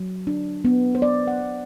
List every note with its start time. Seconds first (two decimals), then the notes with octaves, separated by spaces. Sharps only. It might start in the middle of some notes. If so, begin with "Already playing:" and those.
Already playing: F#3
0.27 D4
0.65 B3
0.95 C5
1.02 B3 D5
1.27 F#5
1.40 B3